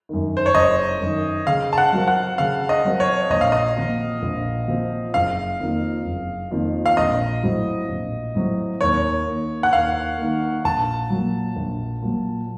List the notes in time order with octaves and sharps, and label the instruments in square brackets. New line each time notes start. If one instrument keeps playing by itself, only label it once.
[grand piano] F#2 D#3
[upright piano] C5
C#5
[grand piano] F#1 [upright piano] D#5
[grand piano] F#2 D#3
[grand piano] C#3 [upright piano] F5
[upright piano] A5
F#5
[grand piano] F#3 C4 F#4 A#4
[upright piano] F#5
[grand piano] C#3 [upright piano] F5
[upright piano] D#5
[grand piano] F#3 C4 F#4 A#4
[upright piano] C#5
[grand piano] A#1 [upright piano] D#5
[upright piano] F5
D#5
[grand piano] A#2 F3 C4 F4
A#1
A#2 F3 C4 F4
[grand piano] F#1 [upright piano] F5
[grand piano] F2 D#3 A#3 F4
F#1
F2 D#3 A#3 F4
[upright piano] F5
[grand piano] A#1 [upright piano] D#5
[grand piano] A2 F#3 C4 F#4
A#1
A2 F#3 C4 F#4
[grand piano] D#2 [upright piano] C#5
[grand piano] D#3 A#3
[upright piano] F#5
[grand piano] D#2 [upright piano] F5
[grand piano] D#3 A#3
[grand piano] A#1 [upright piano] A5
[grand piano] A#2 F#3
A#1
A#2 F#3